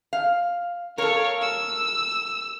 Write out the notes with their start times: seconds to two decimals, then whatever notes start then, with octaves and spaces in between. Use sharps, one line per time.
0.13 F5
0.98 A4 A#4 C#5 F5
1.42 E6